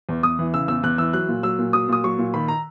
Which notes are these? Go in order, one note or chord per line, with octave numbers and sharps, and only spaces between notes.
E2
E2 D#6
E3
C#3 E6
E2 E6
E2 F#6
E3 E6
F#3 F#6
A#2
F#3 E6
A#2
F#3 D#6
A#2 D#6
F#3 C#6
A#2
D#3 B5
A#5